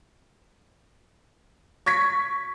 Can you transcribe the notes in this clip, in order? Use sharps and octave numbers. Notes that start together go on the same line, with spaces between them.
C#6 G#6 B6